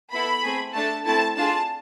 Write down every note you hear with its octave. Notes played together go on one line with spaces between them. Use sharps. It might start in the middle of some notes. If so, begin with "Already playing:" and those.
B3 E4 A4 B5
A3 C4 G#4
A3 D4 A4 A5
A3 C4 E4 A5
D4 F4 G#4 A5